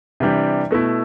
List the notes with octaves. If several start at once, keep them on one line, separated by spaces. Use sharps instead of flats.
C3 E3 G3 D4 G4
B2 A3 E4